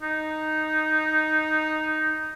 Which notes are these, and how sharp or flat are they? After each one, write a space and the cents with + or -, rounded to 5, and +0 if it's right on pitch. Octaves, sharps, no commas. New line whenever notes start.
D#4 +0